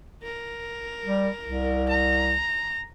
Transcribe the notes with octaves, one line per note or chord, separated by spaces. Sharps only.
A#4
G3
C2
A#5